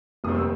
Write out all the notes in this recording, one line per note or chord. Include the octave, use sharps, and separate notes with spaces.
F1 D#2 D#3 G3 C4 D#6
E6